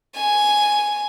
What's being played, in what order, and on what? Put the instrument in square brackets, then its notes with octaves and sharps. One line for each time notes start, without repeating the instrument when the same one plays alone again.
[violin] G#5